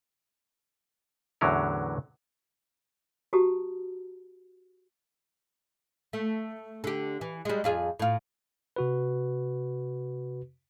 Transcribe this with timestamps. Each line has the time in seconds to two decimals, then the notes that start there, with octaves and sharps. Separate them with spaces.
1.41 E2 A2 D3 F#3 C#4 A#4
3.33 F#4 G4 A5 A#5 D#6
6.13 A3
6.84 D3 G4
7.21 E3
7.45 G3 G#3
7.64 F2 F4 G#4
7.99 A2 F4
8.76 C3 F#4 B4